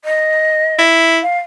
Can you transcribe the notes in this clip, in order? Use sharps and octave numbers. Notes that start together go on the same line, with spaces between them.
D#5
E4
F5